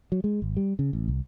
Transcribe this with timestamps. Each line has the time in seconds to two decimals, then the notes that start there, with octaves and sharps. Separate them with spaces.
0.12 F#3
0.24 G#3
0.42 G#1
0.57 G3
0.79 C#3
0.93 A1
1.08 C2